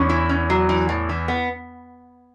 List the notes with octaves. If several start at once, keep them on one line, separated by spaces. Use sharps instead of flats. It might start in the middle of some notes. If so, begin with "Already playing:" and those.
Already playing: E2 C#4
E4
C#4
F#3
E3
A2
E3
B3